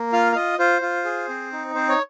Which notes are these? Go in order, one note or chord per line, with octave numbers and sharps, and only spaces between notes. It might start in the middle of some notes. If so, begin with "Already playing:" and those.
Already playing: A#3
F4 F5
F5
F4 D#5
F4 C5
F4
G#4
C4
D#4
C4 C5
C#5